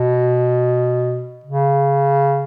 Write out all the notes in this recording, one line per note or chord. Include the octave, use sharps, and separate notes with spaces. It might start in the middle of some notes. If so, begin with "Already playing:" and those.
Already playing: B2
C#3